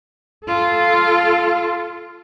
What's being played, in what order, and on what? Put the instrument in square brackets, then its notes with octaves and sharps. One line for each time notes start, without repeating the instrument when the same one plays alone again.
[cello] F4 A4